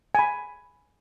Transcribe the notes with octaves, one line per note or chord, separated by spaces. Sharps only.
G#5 B5